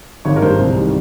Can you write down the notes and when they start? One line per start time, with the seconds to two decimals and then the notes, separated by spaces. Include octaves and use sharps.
0.25 G#1 C#5
0.36 A#4
0.42 G2 G3 C5
0.59 C2
0.76 C3 D#3 G3